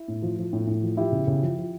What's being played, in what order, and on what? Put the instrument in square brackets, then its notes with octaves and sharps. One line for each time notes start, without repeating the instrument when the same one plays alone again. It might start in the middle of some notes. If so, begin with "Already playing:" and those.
Already playing: [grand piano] E4
A2
F3
F3
A2
A2
F3
F3 E4 G4
C#3
C#3
F3
F3